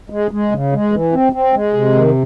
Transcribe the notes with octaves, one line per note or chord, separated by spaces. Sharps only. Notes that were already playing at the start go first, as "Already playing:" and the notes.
G#3
G#3
C#3
G#3
E3
C4
C4
G#3
C3
D#3